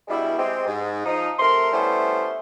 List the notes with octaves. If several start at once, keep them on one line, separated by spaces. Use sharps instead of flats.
G2 B2 G3 G#3 E4
G#3 C4 G4
G#2
F3 D#4
C3 A3 A#4 C6
G3 A3 B3 C#4 E4 C5